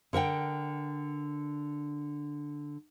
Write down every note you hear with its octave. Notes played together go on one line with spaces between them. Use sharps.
D3 A#4 F#5 G5